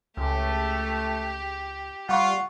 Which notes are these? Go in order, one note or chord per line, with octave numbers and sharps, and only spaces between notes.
C#2 A3 G4
G3 F4 F#5 C#6